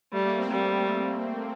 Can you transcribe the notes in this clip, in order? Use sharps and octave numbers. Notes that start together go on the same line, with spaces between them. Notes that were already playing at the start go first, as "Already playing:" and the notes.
G3 A3
A#3
C4
G3